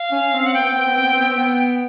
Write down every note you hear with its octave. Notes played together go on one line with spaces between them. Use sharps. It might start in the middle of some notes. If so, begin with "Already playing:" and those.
Already playing: F5
C#4
C4
F#5
B3 G5
C4
B3
C4
B3
C4
B3
C4
B3
C4
B3